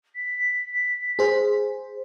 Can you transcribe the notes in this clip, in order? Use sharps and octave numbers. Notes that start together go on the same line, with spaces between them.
B6
G#4 C5